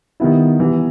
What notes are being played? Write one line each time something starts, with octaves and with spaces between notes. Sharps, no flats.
D#3 G3 B3 E4
E3 G3 B3